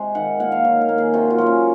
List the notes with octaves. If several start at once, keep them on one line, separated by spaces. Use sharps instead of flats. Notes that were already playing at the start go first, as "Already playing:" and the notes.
Already playing: C3 G#3
D#3 F#5
A#3 F#5
F5
D#3 C#5
A#4
A#3
G#4
C3 F#4
F4
F#3 A#3
C#4